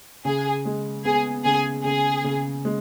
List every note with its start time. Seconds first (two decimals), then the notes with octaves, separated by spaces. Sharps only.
0.25 C#3 G#4
0.65 G#3
1.05 B3 G#4
1.45 C#3 G#4
1.85 C#3 G#4
2.24 C#3
2.65 G#3